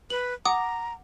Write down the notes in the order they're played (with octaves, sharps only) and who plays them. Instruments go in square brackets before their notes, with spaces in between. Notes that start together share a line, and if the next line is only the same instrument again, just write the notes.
[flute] B4 [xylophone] F#7
[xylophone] F#5 D6 D#6 [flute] A#5